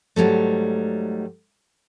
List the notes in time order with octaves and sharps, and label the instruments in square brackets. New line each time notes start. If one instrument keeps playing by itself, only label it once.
[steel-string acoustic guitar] G#2 F#3 G3 A3